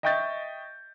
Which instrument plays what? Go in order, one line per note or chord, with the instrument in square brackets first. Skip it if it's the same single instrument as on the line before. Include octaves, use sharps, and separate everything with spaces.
[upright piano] D#5 E5 G5 C#6 G6 A6